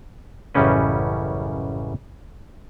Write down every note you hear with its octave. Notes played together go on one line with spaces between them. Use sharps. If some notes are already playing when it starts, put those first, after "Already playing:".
A1 F#2 C#3 G3 C#4 B4